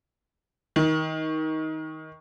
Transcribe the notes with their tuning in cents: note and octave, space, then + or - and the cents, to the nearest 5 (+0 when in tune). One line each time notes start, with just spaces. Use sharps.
D#3 +20